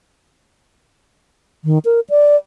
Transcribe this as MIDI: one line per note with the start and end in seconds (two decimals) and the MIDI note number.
1.65 1.78 51
1.85 2.00 70
2.10 2.36 74